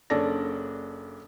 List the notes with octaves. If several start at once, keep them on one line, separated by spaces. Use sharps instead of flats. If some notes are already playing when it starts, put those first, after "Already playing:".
F#1 C#4 D4 A4 D5 A#6